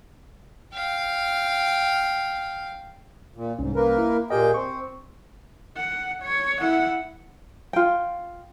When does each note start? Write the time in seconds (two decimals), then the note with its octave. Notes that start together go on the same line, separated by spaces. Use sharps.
0.74 F5 G5
3.36 A#2
3.59 C2 G#2 C#4
3.76 A#3 A#4 B4
3.98 E4
4.30 A#2 G4 G#4 A#4 D#5 G5
4.54 C4 C#6
5.77 F#5
6.23 C#5
6.60 E4 F#5
7.73 F4 G5